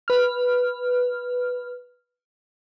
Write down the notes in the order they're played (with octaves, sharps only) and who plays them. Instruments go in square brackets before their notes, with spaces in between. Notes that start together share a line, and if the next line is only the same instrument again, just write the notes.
[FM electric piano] B4 F6